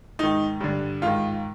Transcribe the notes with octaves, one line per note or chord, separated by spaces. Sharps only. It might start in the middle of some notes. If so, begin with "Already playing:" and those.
G#2 D#3 D#4
G2 D3
G#2 D#3 F4